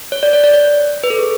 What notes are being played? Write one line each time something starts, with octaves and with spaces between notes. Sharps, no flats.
C#5
D5
C#5
D5
C#5
B4
A4
G#4